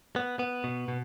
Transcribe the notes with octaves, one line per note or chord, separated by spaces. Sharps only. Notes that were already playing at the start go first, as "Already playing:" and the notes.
B3
B3
B2
B2